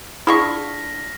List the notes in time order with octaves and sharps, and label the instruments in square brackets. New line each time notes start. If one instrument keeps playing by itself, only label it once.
[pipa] D3 F4 C#6 [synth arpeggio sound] E4 G#4 [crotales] F6 A#6 B6